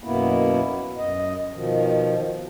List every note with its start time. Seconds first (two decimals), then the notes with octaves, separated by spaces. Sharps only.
0.04 F#2 B2 A#3 B3 E4
0.98 F#2 D#5
1.53 B2 D#3 F3